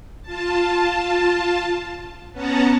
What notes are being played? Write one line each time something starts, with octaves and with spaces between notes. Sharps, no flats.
F4 A5
B3 C#4 F#5 A5 A#5